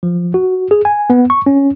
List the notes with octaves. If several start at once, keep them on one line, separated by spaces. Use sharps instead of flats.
F3
F#4
G#4
G#5
B3
C#6
C#4